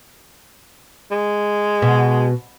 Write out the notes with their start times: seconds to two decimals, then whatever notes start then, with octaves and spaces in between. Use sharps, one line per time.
1.12 G#3
1.82 B2